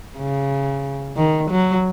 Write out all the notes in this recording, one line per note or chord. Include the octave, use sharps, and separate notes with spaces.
C#3
D#3
F#3